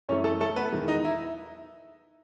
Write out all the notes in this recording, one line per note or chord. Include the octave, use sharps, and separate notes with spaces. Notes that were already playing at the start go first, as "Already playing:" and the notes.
F#2 E3 A3 C#4 C#5
A3 A4
A3 A4
B3 B4
E2 D#3 G#3
D#4 D#5
E4 E5